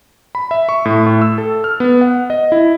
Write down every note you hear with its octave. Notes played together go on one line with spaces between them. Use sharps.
B5
E5
C#6
A2
A2
E6
A4
F6
B3
F#5
D#5
E4